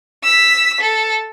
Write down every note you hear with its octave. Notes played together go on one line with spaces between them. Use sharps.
E6 B6
A4